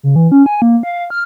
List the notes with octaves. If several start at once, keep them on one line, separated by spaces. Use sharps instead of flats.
C#3
E3
C#4
G#5
A#3
F5
F5
F6